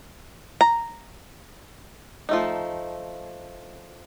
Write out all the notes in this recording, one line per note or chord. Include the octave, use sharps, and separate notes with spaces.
A#5
F3 A3 D#4